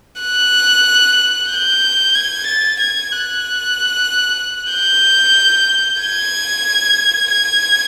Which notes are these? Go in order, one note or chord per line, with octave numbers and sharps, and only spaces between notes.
F#6
G6
G#6
A6
G#6
F#6
G6
G#6
G#6